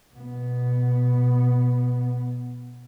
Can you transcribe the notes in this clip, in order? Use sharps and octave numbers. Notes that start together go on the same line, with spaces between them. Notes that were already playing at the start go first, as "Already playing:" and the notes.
B2 B3